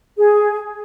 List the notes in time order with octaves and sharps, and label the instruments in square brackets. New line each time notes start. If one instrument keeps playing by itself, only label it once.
[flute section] G#4